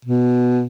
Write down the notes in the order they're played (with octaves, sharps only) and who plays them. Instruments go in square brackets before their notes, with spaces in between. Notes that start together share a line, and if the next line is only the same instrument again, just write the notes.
[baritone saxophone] B2